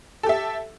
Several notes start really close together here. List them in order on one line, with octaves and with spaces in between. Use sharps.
A4 G4 E5